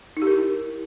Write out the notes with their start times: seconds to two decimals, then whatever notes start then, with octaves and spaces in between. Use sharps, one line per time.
0.17 D#4
0.22 G4
0.27 A#4
0.32 E4